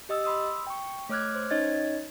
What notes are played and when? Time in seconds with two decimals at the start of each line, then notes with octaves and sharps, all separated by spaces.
0.09 G4 D#5 D#6 E6
0.24 B5 C6 D#6 E6
0.67 G5 C#6
1.09 A3 C#5 D6 F6 F#6 G#6
1.35 C5
1.50 C#4 D#4 C#5 D#5 G#6 A6